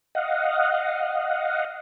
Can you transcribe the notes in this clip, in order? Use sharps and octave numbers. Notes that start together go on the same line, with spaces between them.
D#5 F5 F#5